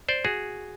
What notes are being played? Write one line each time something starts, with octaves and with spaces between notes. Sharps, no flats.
C5 D5
F#4 G#4